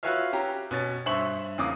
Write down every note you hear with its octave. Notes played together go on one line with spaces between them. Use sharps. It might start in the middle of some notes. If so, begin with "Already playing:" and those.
F4 F#4 B4 C#5 E5 F5
C#4 G4 A#5
B2 C#4 A6
G2 C5 E5 C#6 F#7
E2 C#3 A#3 D6 D#6